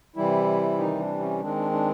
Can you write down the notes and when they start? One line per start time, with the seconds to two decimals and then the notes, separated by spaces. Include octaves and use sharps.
0.16 C3 E3 G3 E4
0.78 D#3 D#4
0.99 D4
1.19 C#4
1.40 D#3 G#3 C4 D4
1.56 D4
1.71 D4